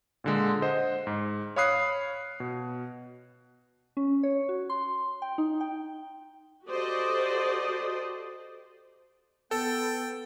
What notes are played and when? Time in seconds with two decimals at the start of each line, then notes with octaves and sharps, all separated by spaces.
0.24 A#2 D3 G#3
0.62 C5 D#5 F#5
1.07 G#2
1.56 C#5 F5 B5 D#6 F#6 C7
2.40 B2
3.97 C#4
4.23 C#5
4.49 F#4
4.70 C6
5.22 G5
5.38 D#4
5.60 G5
6.67 F#4 G4 A4 C5 D5 D#5
9.51 B3 A4 G5